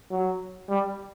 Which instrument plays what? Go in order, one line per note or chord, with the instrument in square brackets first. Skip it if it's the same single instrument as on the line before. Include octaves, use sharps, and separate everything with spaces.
[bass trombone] F#3
G3